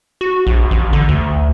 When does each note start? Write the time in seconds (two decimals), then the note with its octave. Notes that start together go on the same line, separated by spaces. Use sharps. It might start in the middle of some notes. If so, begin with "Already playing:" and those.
0.21 F#4
0.47 A#1
0.71 A1
0.93 D3
1.09 D2